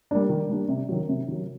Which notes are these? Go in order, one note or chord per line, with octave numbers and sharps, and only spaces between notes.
G3 A#3 D4
D#3
G3 A#3 D4
C3
D#3 F#3
C3
D#3 F#3